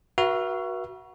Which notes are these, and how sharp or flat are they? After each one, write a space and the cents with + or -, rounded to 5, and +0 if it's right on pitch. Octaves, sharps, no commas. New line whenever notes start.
F#4 +0 B4 -45 E5 +40